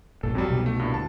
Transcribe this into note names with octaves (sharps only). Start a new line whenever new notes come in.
B1 G2 A#2 A4
G#1 F2 F#3 G3 C4
C2 B2 B3
A3
G2 A#2 E4
D2 A5